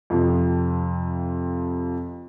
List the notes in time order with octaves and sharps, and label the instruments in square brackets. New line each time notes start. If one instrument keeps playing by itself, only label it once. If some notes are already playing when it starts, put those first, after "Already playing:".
[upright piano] F2 C3 F3